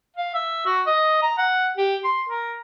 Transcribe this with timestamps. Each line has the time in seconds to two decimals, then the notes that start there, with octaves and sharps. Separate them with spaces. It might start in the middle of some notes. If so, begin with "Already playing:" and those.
0.16 F5
0.35 E5
0.66 F#4
0.86 D#5
1.22 A#5
1.38 F#5
1.77 G4
2.04 C6
2.29 A#4